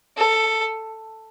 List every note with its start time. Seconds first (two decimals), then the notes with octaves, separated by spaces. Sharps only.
0.17 A4